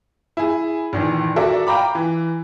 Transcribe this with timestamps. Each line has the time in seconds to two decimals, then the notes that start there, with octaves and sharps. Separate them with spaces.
0.37 E4 G#4
0.93 A#1 D#3 E3
1.36 F#4 A4 A#4 D5 E5
1.67 F5 G5 A#5 B5 D6
1.95 E3